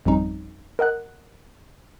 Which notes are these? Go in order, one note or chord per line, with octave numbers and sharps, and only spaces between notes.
G#1 F2 G3 C#4 D#4
A#4 D#5 F#5 F#6